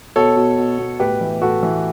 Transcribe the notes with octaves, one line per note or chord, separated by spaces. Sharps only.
B2 A4 C#5
B2
B2
B2
A2 G4 B4
E3
A2 F#4 A4
E3